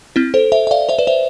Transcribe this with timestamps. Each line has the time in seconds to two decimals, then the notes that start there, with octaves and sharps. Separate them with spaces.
0.16 C4 E4
0.34 A4 C5
0.52 C5 E5
0.67 E5
0.71 D5 F5
0.89 C5 E5
0.99 B4 D5
1.07 C5 E5